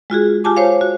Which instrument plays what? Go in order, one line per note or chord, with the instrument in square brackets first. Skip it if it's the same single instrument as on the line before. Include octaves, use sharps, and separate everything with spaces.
[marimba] G#3 F4 F#4 G#4
F4 G4 G#5 A5 D6
C5 C#5 F5
F#4